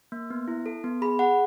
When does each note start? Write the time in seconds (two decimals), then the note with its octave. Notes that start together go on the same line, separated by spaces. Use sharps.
0.12 A#3
0.30 B3
0.48 E4
0.66 A4
0.84 B3
1.02 G#4 B5
1.19 G#4 F#5